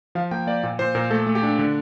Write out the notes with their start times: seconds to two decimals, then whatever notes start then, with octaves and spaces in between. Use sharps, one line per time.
0.15 F3 F5
0.31 A#3 G5
0.47 A#3 D5
0.63 A#2
0.79 A#2 C5
0.95 A#2 A#4
1.10 A3 A4
1.27 A3
1.35 G4
1.43 D4
1.59 D3